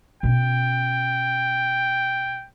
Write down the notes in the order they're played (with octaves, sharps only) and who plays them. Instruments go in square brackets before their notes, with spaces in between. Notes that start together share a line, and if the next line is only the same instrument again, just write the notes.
[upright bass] B2 C#4 [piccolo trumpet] G5